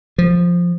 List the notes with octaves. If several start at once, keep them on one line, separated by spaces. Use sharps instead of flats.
F3